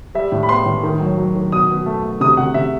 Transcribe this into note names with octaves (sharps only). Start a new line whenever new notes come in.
G3 E5
A2
B5
B3 C6
A2
D#3
F#3
F#3
D#3
B2 D#6
B2
A3
A3
C3 D#6
C3 F#5
C3 E5